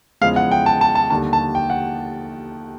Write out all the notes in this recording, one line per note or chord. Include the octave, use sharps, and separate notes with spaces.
E2 C#3 F3 G#3 F5
F#5
G5
A5
A5
A5
D#2 D3 G3 A5
A5
G5
F#5